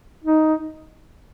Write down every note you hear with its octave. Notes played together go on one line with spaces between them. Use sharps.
D#4